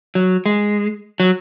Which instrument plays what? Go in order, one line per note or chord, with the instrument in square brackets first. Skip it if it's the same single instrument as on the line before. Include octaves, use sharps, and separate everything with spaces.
[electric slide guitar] F#3
G#3
F#3